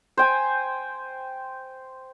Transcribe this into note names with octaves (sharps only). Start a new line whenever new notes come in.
C5 G5 G#5